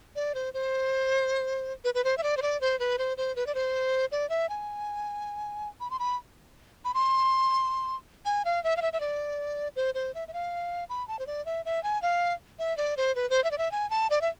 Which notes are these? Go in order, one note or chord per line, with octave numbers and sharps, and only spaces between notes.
D5
C5
C5
B4
B4
C5
E5
D5
C5
D5
C5
B4
C5
C5
B4
D5
C5
D5
E5
G#5
B5
C6
B5
B5
C6
G#5
F5
E5
F5
E5
E5
D5
C5
C5
E5
E5
F5
B5
A5
C5
D5
E5
E5
G#5
F5
E5
D5
C5
B4
C5
E5
D5
E5
G#5
A5
D5
E5